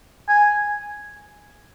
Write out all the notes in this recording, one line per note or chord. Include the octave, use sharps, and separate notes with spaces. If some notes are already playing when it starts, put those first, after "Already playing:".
G#5